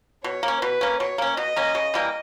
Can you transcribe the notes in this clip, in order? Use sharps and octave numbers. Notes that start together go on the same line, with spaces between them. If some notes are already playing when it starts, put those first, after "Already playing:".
B2 C#5
A#3
C#4
B2 B4
A#3 C#4
B2 C#5
A#3 C#4
B2 D#5
A#3 C#4
C#3
E3 G3 A#3